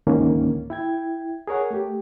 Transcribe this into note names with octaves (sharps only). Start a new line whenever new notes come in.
C#2 G#2 D3 D#3 A#3 C#4
E4 G5 G#6
G#4 A#4 C#5 F#5
A3 G4